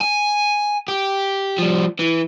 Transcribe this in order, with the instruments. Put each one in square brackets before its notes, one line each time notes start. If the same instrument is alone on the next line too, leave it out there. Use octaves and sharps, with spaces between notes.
[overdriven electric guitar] G#5
G4
F3 G3
E3